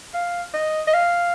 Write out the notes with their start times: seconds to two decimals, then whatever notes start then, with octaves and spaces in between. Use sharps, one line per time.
0.13 F5
0.54 D#5
0.87 D#5
0.94 F5